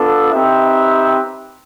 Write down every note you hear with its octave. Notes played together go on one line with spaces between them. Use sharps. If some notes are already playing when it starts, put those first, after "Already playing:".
Already playing: B3 D4 F4 A4
C4 D#4 G4 B4 E5